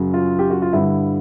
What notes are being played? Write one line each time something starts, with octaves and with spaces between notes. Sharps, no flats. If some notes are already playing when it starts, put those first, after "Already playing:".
Already playing: F#2 C#3 F#3
F4
G4
F#4
F4
G2 D3 G3 E4